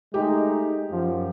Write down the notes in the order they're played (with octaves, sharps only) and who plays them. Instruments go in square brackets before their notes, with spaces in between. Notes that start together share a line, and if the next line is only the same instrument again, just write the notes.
[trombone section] G#3 A3 D#4 [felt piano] G4
[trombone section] F#2 F3